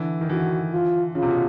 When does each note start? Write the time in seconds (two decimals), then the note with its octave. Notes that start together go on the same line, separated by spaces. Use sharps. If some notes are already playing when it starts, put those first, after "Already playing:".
Already playing: D3 E3
0.21 D#3
0.30 D3 E3 F#4
0.73 F4
1.15 C#3 F4
1.22 C3
1.30 B2